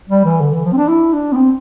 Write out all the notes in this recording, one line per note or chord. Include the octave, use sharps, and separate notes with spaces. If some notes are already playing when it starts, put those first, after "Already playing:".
G3
E3
D3
E3
F3
C4
D4
E4
D4
B3
C4